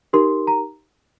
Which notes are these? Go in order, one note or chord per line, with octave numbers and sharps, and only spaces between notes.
D#4 G4 A#4 C6
A#5